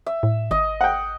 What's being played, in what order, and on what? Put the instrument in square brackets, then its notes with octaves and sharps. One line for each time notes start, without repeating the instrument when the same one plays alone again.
[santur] E5
[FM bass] A2
[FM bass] G#1 [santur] D#5
[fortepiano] F#5 G5